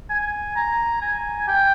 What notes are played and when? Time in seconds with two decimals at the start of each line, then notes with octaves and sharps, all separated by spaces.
0.10 G#5
0.56 A#5
1.02 G#5
1.48 G5